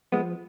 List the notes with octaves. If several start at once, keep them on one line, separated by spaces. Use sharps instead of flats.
F3 G#3 B3